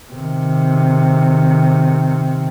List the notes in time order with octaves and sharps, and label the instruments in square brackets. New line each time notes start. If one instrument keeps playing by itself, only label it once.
[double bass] C3 D#3